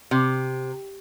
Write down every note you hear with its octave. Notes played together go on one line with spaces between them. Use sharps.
C3